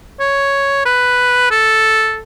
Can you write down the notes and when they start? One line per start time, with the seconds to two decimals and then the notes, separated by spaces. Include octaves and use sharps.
0.20 C#5
0.85 B4
1.51 A4